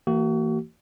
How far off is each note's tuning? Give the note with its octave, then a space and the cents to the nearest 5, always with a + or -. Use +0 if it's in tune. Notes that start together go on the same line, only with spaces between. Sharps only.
E3 +0 A#3 -35 F#4 +35